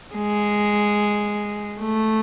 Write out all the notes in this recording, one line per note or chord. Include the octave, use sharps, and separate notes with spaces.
G#3
A3